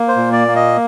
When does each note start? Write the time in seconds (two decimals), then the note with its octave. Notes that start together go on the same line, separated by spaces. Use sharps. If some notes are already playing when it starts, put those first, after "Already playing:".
Already playing: A#3
0.08 C5
0.16 A#2
0.33 D5
0.48 A#3
0.56 D#5